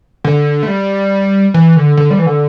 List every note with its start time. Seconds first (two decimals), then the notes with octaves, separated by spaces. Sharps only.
0.24 D3
0.63 A3
0.68 G3
1.54 E3
1.76 D3
1.97 D3
2.10 G3
2.19 E3
2.26 D3